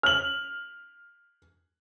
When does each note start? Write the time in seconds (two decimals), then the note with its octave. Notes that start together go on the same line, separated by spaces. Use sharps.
0.03 F6 F#7